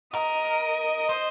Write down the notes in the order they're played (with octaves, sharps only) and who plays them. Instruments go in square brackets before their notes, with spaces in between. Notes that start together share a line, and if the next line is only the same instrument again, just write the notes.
[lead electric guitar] A#4 [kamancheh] D#5
[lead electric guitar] C5